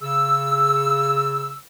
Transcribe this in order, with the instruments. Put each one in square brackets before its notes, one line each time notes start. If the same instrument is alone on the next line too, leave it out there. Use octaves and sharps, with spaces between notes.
[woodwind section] C#3 E6